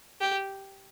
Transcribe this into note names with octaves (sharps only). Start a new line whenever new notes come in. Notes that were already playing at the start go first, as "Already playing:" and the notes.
G4